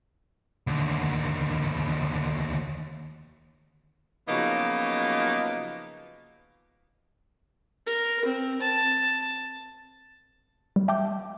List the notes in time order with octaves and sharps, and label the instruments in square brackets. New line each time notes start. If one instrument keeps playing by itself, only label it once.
[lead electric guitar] D#2 D3
[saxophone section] C#3 F3 F#3 A#3 B3 D#4
[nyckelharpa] A#4
C4
A5
[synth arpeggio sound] G3
E5 G5 A5 D6 G6